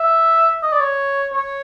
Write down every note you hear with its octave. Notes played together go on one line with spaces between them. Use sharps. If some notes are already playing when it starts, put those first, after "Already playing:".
Already playing: E5
D#5
D5
C#5
C#5